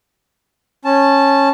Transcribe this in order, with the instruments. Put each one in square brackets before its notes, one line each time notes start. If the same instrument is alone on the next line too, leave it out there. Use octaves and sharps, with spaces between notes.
[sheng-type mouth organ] C#4 A5